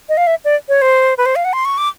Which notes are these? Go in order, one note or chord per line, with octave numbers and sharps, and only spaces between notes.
D#5
F5
E5
D5
C#5
C5
B4
C5
F5
F#5
C6
C#6
D6